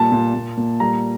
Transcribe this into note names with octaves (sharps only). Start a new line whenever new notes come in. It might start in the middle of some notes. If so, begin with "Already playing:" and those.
Already playing: A#2 G3 A5
A#2
A#2
A#2
G3 A#5